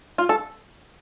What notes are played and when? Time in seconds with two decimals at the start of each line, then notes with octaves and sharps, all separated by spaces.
0.18 F4
0.29 A4